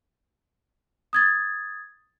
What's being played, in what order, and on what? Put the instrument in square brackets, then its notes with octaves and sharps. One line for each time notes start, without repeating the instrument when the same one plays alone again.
[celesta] D#6 G#6 A6